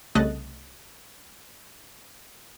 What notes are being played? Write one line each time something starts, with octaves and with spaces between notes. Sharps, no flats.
C2 C#3 A3 D#5 F#6 A6